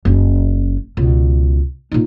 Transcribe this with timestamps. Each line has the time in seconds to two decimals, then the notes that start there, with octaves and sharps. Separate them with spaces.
0.05 F#1 C#4
0.97 C#2 B2
1.92 A#2 D#4